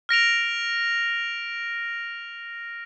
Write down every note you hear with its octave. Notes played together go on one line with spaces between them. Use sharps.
F6 A#6 D7 F7